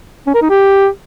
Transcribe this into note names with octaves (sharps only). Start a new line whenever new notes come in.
C#4
A#4
D#4
G4